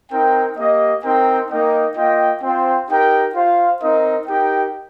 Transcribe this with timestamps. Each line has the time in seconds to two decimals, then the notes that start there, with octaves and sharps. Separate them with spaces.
0.12 C4 D#4 A#4 G5
0.58 A#3 G4 D#5
1.04 C4 D#4 A#4 G5
1.50 A#3 D#4 A#4 D#5 G5
1.96 A#3 F4 D#5 G5
2.42 C4 F4 C5 G5
2.90 D#4 G4 A#4 G5
3.35 F4 C5 F5
3.81 C4 D#4 A#4 D#5
4.27 D#4 G4 A#4 G5